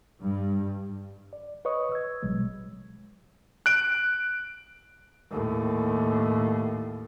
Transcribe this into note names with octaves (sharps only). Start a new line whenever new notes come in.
G2
D5
B4 C#5 D#5 C#6 D#6
E6 G#6
A1 B2 F#3 G#3
F#6 D7
D#2 A2